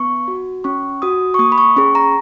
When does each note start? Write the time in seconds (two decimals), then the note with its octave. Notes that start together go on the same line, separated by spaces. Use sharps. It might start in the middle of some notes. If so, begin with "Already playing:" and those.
Already playing: B3 C#6
0.28 F#4
0.64 C#4 C#6
1.02 F#4 D#6
1.34 C#6
1.39 A#3 D#6
1.52 B5
1.58 C#6
1.77 C#4 G#4 C#6
1.95 A#5